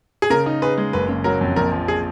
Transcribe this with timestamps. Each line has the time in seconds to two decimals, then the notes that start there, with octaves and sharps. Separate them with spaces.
0.22 G#4
0.30 C#3 A#4
0.46 D#4
0.62 G#4 B4
0.78 G#3
0.93 F#1 B4
1.09 C#3
1.24 F#3 A#4
1.41 F2
1.56 A#1 A#4
1.72 F3
1.88 G#4